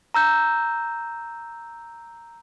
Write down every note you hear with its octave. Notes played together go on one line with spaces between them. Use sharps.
A#5 E6 G6